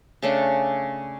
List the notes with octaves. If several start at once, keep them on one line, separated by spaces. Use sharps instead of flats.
C#3 A3 D4